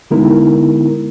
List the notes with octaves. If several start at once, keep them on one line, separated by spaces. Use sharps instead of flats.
D3 G#3 B3 D#4 E4 A#4